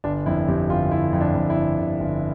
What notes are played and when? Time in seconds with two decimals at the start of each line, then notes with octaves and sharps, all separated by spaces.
0.04 G1 D4
0.26 F2 E4
0.48 F2 G4
0.69 G1 F4
0.91 G1 E4
1.13 F2
1.21 D4
1.35 F2
1.50 E4
1.56 G1
1.78 G1
2.00 G1